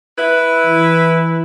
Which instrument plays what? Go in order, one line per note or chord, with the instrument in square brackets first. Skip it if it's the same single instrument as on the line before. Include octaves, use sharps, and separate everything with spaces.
[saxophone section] E4 B4
[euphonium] E3